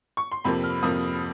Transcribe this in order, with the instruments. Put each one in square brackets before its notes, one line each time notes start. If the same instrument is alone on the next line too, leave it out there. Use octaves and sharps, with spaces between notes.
[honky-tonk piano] C#6
C6
F2 C3 F3 A#3 B5
F6
F2 C3 F3 A#3 D#6